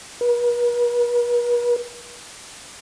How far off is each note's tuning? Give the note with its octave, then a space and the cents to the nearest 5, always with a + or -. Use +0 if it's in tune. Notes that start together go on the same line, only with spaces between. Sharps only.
B4 -45